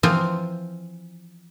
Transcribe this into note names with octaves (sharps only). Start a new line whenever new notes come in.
E3 F3 C4 F4